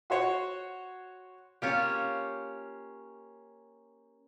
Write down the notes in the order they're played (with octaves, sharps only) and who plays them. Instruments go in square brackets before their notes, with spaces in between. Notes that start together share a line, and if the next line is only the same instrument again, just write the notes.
[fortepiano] F#4 C5 C#5 F#5
[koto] A#3 C#4 F4 G4